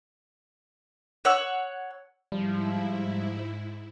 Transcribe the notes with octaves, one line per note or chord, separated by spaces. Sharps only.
C#5 F#5 E6
G#2 F3 G3 E4